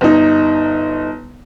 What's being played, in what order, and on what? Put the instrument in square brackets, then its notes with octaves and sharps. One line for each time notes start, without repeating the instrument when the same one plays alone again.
[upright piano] G1 D#4